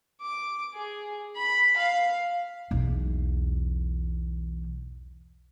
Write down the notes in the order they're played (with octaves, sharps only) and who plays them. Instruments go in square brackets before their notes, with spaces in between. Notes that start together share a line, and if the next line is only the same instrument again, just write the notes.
[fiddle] D6
G#4
B5
F5
[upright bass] B1 E2